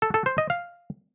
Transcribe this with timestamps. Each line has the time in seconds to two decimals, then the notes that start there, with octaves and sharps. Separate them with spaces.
0.02 A4
0.14 A4
0.26 C5
0.38 D#5
0.50 F5